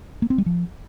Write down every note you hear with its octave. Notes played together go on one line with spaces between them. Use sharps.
A#3
C4
G3
F3